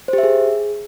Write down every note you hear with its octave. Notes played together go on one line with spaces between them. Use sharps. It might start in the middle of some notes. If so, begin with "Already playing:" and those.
C5
G4
E5
G#4